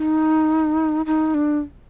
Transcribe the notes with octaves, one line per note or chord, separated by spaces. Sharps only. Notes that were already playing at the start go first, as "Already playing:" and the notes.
Already playing: D#4
D#4
D4